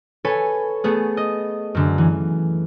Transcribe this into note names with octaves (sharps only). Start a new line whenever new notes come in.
A4 B4 C#5 G#5
A3 B3 G#4
D#5
F#2 D3
E3